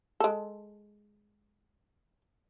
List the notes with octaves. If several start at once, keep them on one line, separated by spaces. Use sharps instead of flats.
G#3 A4